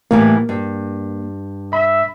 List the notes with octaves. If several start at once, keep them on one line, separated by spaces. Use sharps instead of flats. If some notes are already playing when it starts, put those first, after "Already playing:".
A2 E3 G3 A#3
G2
E5 B5